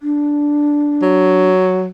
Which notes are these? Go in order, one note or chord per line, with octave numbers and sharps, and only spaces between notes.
D4
F#3